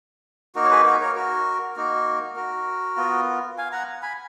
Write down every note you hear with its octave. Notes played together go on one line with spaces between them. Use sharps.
A#3 D#4 F#4 A#4
C#5
G#4 B4
F#4 A#4
A#4 C#5
F#4 A#4
A#3 D#4 F#4 A#4
F#4 A#4
B3 F4
F5 G#5
F#5 A#5
G#5 B5